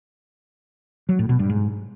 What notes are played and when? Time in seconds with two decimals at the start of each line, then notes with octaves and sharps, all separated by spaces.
1.09 F#3
1.19 A2
1.29 B2
1.39 G2
1.49 G#2